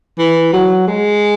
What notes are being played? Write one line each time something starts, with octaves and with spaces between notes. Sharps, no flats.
E3
F#3
G#3